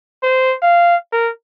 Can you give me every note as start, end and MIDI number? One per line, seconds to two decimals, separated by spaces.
0.23 0.56 72
0.62 0.96 77
1.13 1.30 70